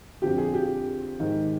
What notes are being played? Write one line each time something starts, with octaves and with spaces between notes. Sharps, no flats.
F2 D3 F3 G4
G#4
G4
G#2 D#3